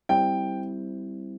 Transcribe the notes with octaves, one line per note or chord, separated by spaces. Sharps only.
G3 C4 E4 G5